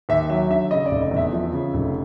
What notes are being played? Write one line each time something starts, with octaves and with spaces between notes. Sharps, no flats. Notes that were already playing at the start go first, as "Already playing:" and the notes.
D#2 E5
F#3 E5
D3 E5
C#3 D#5
D5
F1
D#5
E2
E5
F3
C#3
F1